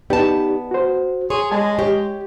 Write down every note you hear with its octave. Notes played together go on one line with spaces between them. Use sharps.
B3 D#4 G4 D5 A5
F#4 C5
G#4 C#5 C6
G#3 G#4 G#5 A5
G4 C#5